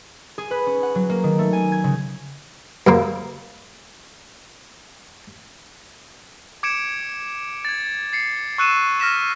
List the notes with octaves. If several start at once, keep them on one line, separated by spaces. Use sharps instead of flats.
G#4
B4
C#4
F#5
F#3
A#3
D#3
A3
G#5
G#6
C#3
F#2 C#3 A#3
D6 G#6 C#7 D7 E7
G#6 A6
A6 C7 C#7
C#6 E6 F#6 C#7 D#7 E7
F6 A#6 B6 E7